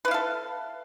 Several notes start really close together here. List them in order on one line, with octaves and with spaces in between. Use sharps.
B4 E4 F5 A4